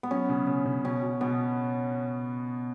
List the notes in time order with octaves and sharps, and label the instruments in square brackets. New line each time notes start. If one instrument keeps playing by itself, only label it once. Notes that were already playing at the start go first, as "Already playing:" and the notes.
[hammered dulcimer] B3
[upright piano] F#3 [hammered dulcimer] C#4
[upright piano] C#3
C#3
C#3
[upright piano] B2 [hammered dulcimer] C#4
[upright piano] B2
[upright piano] B2 [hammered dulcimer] B3